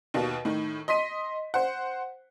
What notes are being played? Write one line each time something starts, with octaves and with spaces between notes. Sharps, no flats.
D#2 B2
A2 D#3
D#5 C6 B6 D#7
C5 F#5